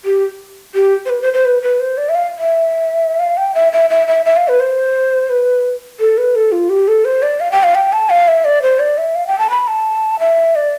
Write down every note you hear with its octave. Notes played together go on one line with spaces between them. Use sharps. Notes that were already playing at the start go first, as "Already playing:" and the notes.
G4
G4
C5
B4
C5
C5
B4
B4
C5
D5
E5
F5
E5
F5
G5
E5
E5
E5
E5
E5
F5
B4
C5
B4
A4
B4
A4
F4
G4
A4
C5
D5
F5
G5
F5
G5
A5
F5
E5
D5
C5
D5
E5
F5
G5
A5
B5
A5
E5
D5